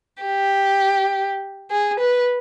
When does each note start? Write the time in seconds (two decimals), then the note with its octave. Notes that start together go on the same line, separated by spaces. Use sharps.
0.23 G4
1.71 G#4
2.00 B4